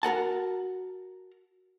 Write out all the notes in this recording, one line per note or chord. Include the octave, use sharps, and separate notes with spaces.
F#4 A#4 F#5 A5